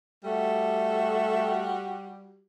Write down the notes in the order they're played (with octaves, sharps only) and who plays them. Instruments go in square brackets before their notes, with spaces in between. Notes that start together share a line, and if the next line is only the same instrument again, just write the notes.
[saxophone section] G3 F#4 G4 [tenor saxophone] A3